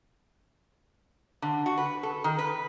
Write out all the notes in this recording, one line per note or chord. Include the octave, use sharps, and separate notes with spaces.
D3
F#4
B4
A4
D#3
B4